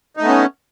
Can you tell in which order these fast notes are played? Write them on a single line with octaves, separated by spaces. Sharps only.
D#4 A3 B3 C#4